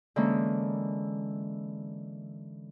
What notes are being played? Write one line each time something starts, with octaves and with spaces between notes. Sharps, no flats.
D3 E3 G#3 A#3 C#4